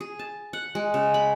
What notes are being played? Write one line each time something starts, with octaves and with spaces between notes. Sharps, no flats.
G#4
A5
F#5
G#3
C#3
B5